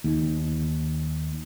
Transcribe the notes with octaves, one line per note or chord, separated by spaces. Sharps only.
D#2